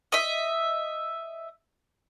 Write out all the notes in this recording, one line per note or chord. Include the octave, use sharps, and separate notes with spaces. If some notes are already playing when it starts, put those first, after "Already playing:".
D#5 E5